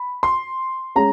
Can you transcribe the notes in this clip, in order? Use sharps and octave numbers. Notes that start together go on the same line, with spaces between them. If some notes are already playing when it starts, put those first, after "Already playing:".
Already playing: B5
C6
G#3 C#4 A#5